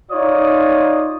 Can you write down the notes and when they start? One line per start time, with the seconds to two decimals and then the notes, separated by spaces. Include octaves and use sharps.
0.12 D#4 F4 C#5 D5 D#6